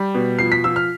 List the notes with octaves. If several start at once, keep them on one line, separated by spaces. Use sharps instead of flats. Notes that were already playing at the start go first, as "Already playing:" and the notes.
Already playing: G3
B2
F3 C7
B6
F3 E6
F6